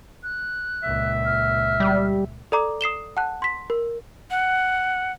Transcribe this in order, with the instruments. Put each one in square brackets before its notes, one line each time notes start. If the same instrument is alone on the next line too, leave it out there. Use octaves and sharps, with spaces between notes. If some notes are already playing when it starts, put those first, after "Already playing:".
[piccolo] F#6
[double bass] C#2 A#2 [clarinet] E5
[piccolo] F6
[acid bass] G3
[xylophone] A4 D5 A#5 D6
D#6 C7 E7 G7
F#5 A5 F#6
C6 B6
A#4
[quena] F#5